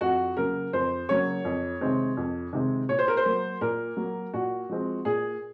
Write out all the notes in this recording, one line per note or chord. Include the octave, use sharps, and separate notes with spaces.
F2 F#4
C#3 F#3 A#3 A#4
F2 C5
C#3 F#3 A#3 C#5
F2
C3 D#3 G#3 C4
F2
C3 D#3 G#3 C4
A#2 C#5
C5
A#4
C5
F#3 A#3
A#2 A#4
F#3 A#3
A#2 F#4
F3 G#3 C4
A#2 G#4